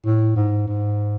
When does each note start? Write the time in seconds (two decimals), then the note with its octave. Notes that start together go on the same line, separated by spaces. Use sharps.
0.05 A2
0.36 G#2
0.67 G#2